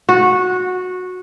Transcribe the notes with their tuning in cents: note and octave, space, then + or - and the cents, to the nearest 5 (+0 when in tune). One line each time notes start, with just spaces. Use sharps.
F#4 -15